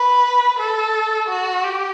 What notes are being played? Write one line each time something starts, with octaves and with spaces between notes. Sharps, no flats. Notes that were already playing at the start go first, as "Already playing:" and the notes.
Already playing: B4
A4
F#4
G4